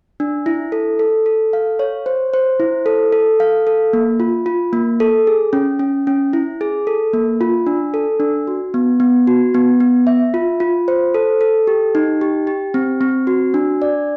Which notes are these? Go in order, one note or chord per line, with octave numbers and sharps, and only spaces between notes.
D4
E4
A4
A4
A4
F5
C#5
C5
C5
E4
A4
A4
F5
A4
A#3
F4
F4
A#3
A4
G#4
C#4
C#4
C#4
E4
G#4
A4
A#3
F4
D4
A4
D4
F#4
B3
B3
F#4
B3
B3
E5
F4
F4
C5
A4
A4
G4
D#4
G4
G4
C4
C4
F#4
D4
D5